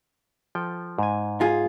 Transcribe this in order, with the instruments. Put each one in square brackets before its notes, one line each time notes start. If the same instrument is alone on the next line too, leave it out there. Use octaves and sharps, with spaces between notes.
[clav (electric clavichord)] F3 A4 G5
G#2 G#5
[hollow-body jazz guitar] F4 G#4